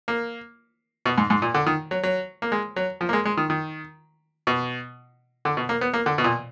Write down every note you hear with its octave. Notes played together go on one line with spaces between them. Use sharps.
A#3
B2
G#2
G#2
A#2
D3
D#3
F#3
F#3
A#3
G#3
F#3
F3
A#3
G#3
G#3
D#3
D#3
B2
D3
B2
A#3
B3
A#3
D3
B2
A#2